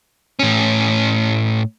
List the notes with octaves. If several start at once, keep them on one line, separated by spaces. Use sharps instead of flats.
A2 C#4